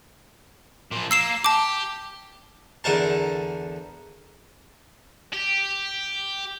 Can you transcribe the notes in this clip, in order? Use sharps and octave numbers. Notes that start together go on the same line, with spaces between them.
A#2 F3
A#3 E6 C7 E7
G4 A5 D6
E2 D3 A#4 A5
G4